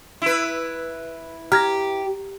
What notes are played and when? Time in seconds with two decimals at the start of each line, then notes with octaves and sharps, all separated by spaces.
0.22 E4 B4
1.52 G4 A#5 F6 G#6 A#6